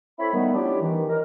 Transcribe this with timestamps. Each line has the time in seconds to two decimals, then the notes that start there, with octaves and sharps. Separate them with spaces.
0.19 C4 E4 A4 C#5 B5
0.33 D#3 G3 A3 B3
0.55 C#4 D4 E4 F4 G4
0.82 D#3 E3
1.09 D#4 A#4